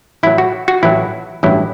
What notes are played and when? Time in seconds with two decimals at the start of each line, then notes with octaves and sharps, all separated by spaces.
0.23 A1 A2 F#3 E4
0.38 F#4
0.68 F#4
0.83 A1 A2 F#3 E4
1.43 A1 G2 F#3 C#4 E4